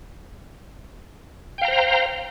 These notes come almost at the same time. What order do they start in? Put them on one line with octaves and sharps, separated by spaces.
G5 F5 A#5 C5